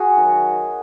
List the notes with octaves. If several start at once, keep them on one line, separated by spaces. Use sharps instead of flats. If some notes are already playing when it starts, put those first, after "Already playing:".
Already playing: F#4 G#4
D#3 F#3